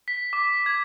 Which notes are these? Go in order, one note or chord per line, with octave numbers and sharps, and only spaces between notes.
B6
D6
G#6